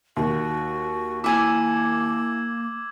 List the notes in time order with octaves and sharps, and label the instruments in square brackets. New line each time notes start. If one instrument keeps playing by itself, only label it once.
[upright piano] D#2 [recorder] F#4
[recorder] A#3 [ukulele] E4 G#5 [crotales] D6 E6 G#6